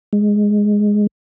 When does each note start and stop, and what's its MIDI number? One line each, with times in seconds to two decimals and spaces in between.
0.13 1.07 56